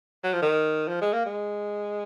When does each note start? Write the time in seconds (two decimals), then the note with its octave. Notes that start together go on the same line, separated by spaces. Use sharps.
0.24 F#3
0.33 F3
0.42 D#3
0.88 F3
1.01 G#3
1.13 A#3
1.26 G#3